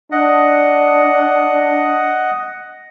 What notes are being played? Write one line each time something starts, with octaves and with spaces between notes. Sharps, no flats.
D4 D#5 F#5